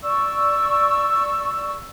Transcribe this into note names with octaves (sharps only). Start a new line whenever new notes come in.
D5 C#6 E6